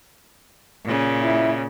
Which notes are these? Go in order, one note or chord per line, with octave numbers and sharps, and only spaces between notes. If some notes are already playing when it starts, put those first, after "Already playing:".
A#2 C#3
E4